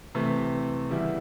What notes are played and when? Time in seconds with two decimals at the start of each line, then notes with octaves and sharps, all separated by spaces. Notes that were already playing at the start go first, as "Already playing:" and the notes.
0.15 C3 E3 A3
0.90 C#3 E3 G3 B3 E4